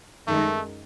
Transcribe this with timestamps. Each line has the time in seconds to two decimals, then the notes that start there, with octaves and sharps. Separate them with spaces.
0.27 F#2 D#3 G#3 A3 D#4